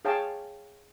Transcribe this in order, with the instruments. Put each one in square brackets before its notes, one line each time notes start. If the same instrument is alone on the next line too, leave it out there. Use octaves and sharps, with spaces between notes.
[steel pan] G#4 C#5 F5 G5 A5